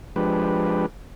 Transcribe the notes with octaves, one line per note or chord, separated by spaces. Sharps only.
F3 G#3 D4 G4 B4